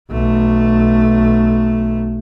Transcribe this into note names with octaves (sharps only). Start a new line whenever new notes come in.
B1 A3